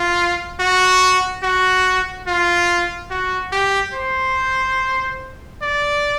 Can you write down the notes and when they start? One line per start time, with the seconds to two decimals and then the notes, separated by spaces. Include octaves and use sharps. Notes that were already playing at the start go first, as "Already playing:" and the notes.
Already playing: F4
0.60 F#4
1.43 F#4
2.27 F4
3.10 F#4
3.52 G4
3.94 C5
5.62 D5